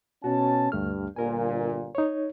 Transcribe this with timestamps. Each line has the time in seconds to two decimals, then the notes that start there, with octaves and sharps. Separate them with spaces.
0.24 B2 C#4 F#4 A5
0.72 D2 G2 A3 F6
1.16 G1 A#2 A#4 G#5
1.95 D#4 C#5